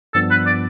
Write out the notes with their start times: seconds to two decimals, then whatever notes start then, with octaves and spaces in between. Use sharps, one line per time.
0.14 G2 F3 B3 D4 A4
0.31 B4
0.46 D5